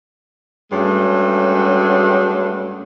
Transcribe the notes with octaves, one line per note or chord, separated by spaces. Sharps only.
G2 F#3 G#3 A3 C#4